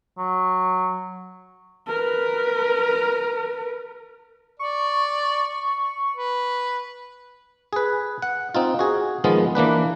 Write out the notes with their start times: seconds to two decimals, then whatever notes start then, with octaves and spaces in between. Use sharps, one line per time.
0.18 F#3
1.87 A#4 B4
4.59 D5 C#6
6.16 B4
7.73 G#4 B4
8.22 F#5
8.55 C4 D#4 F4
8.79 F#4 G#4
9.24 D#3 F3 G#3 B3 F4
9.55 E3 A#3 D4 B4